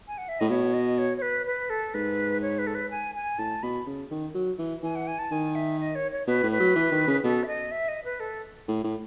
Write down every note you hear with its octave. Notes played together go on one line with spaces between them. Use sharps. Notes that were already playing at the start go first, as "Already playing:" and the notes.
G#5
F#5
E5
A2 D#5
B2 C#5
D#5
C#5
C#5
B4
B4
A4
G#2 B4
C#5
B4
A4
B4
G#5
G#5
A2 A5
B2 B5
C#3
D#3
F#3
E3
E3 G#5
F#5
G#5
A5
D#3 G#5
E5
D#5
C#5
C#5
B2 B4
A2
B4
F#3
E3
D#3
C#3
B2 A4
E5
D#5
E5
D#5
B4
A4
A2
A2